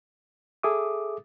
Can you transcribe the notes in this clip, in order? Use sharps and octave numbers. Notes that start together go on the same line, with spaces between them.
G#4 A4 E5 D6 D#6